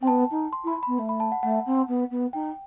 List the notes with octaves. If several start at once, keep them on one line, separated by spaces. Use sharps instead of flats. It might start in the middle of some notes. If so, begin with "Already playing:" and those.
C4 G5
B3 A5
D#4
C6
E4
B5
B3 B5
A3
B5
A5
F#5
A3 F#5
C4
B3
B3
D#4 G5